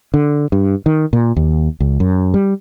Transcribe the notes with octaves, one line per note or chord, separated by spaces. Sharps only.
D3
G2
D#3
A#2
D#2
C#2
F#2
G3